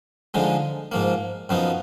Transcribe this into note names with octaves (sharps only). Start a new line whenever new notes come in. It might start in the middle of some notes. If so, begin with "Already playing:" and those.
D3 F3 G#3 D#4
G#2 F3 A#3
F#2 F3 B3 D#4